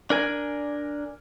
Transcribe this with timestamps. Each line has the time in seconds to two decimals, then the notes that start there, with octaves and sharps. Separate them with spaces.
0.10 D4 A#4 G#5